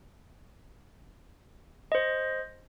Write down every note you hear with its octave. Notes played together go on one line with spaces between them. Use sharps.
C5 D#5